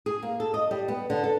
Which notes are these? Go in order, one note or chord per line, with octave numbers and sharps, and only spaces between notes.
G#4
A#3
A4
D#5
G3
B3
D3
A4